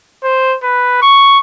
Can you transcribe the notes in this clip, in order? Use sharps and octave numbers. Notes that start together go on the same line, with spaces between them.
C5
B4
C#6